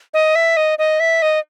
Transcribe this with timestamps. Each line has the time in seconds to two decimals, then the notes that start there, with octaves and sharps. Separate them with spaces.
0.14 D#5
0.35 E5
0.57 D#5
0.78 D#5
1.00 E5
1.22 D#5